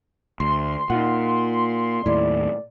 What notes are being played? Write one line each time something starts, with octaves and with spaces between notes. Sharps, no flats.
D2 C6
A#2 D#4 F4 F#5
D#2 A2 E4 D5